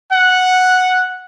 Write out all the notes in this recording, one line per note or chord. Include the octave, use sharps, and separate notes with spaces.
F#5